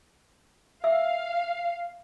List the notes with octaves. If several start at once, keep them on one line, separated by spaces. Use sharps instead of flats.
E5 F5 E6